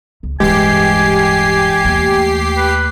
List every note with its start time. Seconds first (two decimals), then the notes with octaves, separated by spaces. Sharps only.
0.23 C#2
0.40 D1 G2 E3 G#3 G4 G#5 C7
1.85 D#2 A3
2.57 B4